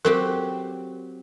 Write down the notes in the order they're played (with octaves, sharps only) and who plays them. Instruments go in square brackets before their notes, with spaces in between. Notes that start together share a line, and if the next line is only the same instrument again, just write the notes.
[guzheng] F#3 C4 G4 [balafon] A4 A#4